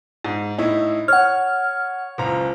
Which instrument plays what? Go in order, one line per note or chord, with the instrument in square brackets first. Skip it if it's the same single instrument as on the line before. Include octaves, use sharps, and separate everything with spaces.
[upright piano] G#2
A2 D#4 E4
[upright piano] C#5 [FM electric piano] F#5 F6
[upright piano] F#1 C#2 A#5